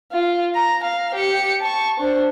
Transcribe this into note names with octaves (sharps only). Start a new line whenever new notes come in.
F4
A#5
F5
G4 C#7
A5 C#6
D4 C5